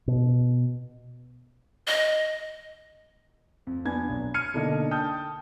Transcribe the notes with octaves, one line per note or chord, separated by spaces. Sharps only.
B2
D#5
F2
B3 D4 G#5 G#6
B1
F6 G#6 C#7 D#7
B2 D3 A#3 D4 D#4
G5 A5 D#6 F6 G6